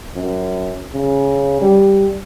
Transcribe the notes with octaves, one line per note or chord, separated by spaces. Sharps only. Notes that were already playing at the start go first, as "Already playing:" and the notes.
F#2
C#3
G3